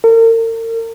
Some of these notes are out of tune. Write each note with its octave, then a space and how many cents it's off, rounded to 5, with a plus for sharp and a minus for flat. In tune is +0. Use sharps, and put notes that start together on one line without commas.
A#4 -40